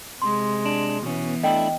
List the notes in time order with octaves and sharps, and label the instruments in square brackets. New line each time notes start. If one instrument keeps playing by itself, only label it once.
[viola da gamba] C3 G#3 [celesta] C6
[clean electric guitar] D4
[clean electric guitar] B2 C#4 [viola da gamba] E3 B3
[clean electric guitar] A3 D4 E4 [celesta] D#5 G5